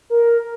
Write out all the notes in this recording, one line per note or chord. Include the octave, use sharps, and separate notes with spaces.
A#4